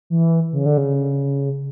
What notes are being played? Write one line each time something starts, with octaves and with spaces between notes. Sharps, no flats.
E3
C#3
D3
C#3